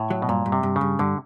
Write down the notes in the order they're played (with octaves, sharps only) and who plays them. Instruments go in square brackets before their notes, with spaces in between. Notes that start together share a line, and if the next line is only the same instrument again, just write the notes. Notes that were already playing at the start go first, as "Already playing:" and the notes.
Already playing: [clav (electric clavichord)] A2
[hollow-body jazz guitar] F#3
[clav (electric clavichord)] B2
[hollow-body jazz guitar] G2 [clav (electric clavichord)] A#2
[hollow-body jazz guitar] G2
[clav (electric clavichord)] C3
[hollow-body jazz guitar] G2
[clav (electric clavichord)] C#3
[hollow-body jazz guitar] G2
[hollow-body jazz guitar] G2 [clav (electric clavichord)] D3